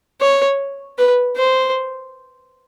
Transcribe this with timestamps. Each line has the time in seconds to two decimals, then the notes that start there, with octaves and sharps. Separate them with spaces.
0.21 C#5
0.98 B4
1.37 C5